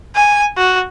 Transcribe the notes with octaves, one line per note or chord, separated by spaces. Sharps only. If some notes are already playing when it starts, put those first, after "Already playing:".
G#5
F#4